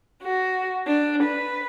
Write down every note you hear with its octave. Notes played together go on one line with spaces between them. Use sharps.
F#4
D4
B4